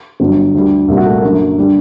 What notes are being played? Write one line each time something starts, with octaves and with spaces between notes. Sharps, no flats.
G1 G2 F#3
D2 D3 G3
C2 A#2 G3
F#4
A3
A#3
F#2 D3 F#3
D3 G3